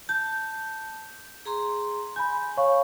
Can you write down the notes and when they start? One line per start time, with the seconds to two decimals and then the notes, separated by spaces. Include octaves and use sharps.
0.09 A5 G6
1.46 G#4 A#5 C6
2.16 G#5 B5 G6
2.57 C#5 F5 C#6